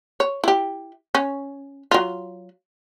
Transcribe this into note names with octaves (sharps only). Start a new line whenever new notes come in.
C#5
E4 G4
C#4
F#3 F4